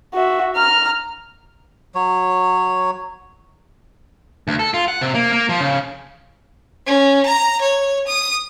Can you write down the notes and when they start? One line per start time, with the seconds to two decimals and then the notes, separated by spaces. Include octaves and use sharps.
0.13 F#4 E5
0.56 A#5 F6
1.95 F#3 C#5
4.48 D2
4.59 A4
4.74 F4
4.88 F#5
5.01 C3
5.15 A#3
5.32 A#3
5.49 F3
5.61 C#3
6.87 C#4
7.26 A#5
7.62 C#5
8.08 D#6